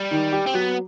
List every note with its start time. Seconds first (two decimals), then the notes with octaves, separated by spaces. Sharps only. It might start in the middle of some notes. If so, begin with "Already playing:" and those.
Already playing: G3
0.11 D#3
0.33 G4
0.47 C4
0.54 F#3 B3